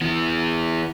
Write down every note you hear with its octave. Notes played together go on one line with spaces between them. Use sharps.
E3 B3